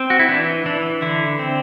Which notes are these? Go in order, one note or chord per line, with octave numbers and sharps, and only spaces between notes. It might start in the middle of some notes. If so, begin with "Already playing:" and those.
Already playing: C4
F#4
E4
E3 D4
E3 D4
D3 E4
C4